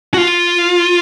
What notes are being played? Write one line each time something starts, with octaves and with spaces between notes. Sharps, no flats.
F#4
F4